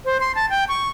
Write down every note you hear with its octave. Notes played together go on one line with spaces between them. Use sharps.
C5
C6
A5
G5
C#6